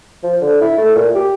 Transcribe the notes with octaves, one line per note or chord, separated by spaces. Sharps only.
F3
D3
E4
A3
A#2
G4